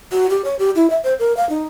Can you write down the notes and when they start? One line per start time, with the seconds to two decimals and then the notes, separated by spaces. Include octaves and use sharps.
0.12 F#4
0.30 G4
0.45 C#5
0.59 G4
0.75 E4
0.90 E5
1.04 C5
1.19 A#4
1.37 F5
1.50 D#4